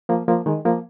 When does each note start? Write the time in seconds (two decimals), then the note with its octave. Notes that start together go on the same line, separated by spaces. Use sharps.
0.09 F3 A#3
0.28 F3 A#3
0.46 D#3 G#3
0.65 F3 A#3